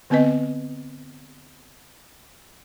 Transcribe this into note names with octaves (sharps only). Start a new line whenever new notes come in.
D3 B3 C4 B4 D#5